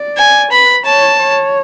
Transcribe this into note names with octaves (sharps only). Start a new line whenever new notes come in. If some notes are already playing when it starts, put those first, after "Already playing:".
Already playing: D5
G#5
B4 B5
C#5 A5
C#5